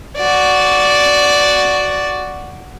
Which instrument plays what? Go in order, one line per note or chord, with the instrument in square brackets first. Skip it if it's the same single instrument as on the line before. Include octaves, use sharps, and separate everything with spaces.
[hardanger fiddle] F#4 D5